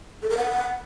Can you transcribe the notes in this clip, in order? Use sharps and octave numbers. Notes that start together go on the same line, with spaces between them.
A4
A#4
F#5